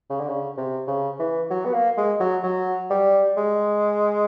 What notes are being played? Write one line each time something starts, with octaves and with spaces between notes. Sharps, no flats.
C#3
D3
C#3
C3
C#3
E3
F#3
B3
A#3
G#3
F#3
F#3
G3
G#3